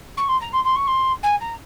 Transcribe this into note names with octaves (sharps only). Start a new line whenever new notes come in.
C#6
C6
A#5
C6
C6
C#6
C6
G#5
A#5